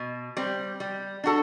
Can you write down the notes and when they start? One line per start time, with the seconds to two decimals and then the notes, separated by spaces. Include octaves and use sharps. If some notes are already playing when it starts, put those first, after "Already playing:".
Already playing: B2
0.37 G3 C4
0.80 G3
1.24 D4 F#4 A4